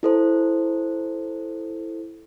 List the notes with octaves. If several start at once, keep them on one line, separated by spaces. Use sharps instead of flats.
E4 A4 C5